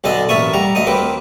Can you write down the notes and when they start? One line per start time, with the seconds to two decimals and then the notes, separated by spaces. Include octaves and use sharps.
0.04 B1 D3 D4 A4 D#5
0.29 A1 A#3 E5 A5 C#6 D#6
0.53 G3 F#5 A#5
0.75 D2 D#5 F#5 D#6
0.87 D#2 A#3 C4 B4 D6